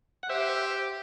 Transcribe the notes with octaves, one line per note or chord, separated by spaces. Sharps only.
F#5
G4 C5 E5